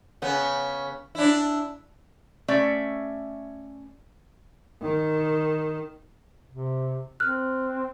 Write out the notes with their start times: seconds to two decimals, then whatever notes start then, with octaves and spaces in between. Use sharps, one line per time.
0.22 C#3 B3
1.15 D4 E4
2.48 A3 C#4 D5 E5
4.81 D#3
6.50 C3
7.20 C4 F6 F#6